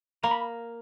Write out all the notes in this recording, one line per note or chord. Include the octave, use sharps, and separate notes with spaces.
A#3 A#5
B5